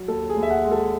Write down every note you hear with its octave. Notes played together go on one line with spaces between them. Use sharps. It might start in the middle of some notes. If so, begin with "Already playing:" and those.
Already playing: F#3
D#2 A4
G#4
D#2
E5
F#5
G#3
A4